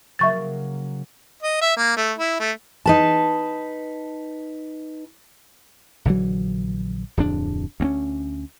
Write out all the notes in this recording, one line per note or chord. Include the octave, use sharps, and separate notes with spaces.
C#3 F#3 A#3 E5 C#6 A6
D#5
E5
A#3
A3
E4
A3
D#4 B4 A5
A#1 D3 E3 F#3
D1 F2 D4
D2 C4 C#4